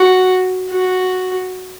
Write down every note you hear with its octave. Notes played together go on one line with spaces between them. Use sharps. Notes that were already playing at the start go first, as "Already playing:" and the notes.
Already playing: F#4
F#4